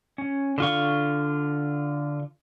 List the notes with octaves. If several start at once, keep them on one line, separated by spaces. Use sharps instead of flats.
C#4
D3 F4 C#6